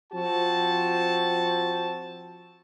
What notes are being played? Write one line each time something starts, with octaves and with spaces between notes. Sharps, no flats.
F3 C4 F#4 A5